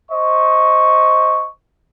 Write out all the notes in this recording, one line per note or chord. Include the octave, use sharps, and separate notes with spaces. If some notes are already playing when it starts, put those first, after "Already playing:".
C5 D#5 C#6